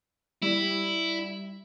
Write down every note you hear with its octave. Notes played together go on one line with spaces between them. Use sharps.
G3 E4